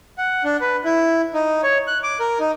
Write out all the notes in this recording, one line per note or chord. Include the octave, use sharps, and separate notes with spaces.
F#5
D4
B4
E4
D#4
C#5
F#6
D6
A#4
D#4